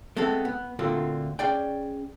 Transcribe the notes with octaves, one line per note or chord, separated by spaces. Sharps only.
G#3 A3 B3 C4 A4
B3
D2 A#2 D3 A3 C4 F4
C#4 G#4 D5 G5